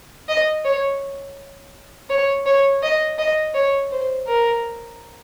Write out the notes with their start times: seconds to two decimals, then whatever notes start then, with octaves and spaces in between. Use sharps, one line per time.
0.28 D#5
0.65 C#5
2.09 C#5
2.46 C#5
2.83 D#5
3.18 D#5
3.54 C#5
3.92 C5
4.27 A#4